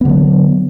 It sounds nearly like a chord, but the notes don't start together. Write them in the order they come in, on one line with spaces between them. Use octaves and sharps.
B3 D3 F#3